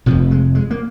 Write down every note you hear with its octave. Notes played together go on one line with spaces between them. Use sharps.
F1 F2 C3 F3
G#3
G#3
A#3